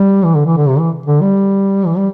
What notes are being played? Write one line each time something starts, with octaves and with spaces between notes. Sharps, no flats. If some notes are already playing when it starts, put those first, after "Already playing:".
Already playing: G3
E3
D3
E3
D3
C3
E3
D3
G3
E3
G3